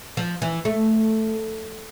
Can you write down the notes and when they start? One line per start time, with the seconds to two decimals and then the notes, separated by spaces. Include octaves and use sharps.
0.17 F3
0.42 E3
0.65 A3